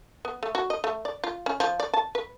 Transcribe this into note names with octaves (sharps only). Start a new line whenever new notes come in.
B3
A3
F#4
D#5
A3
D5
F4
C#4
F3
D5
A5
B4